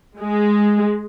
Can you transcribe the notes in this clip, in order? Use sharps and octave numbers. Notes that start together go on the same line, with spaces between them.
G#3